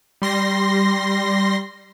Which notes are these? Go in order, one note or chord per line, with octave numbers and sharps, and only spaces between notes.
G3 C6 A#6